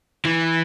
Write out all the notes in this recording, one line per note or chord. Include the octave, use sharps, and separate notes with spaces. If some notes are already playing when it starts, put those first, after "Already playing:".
E3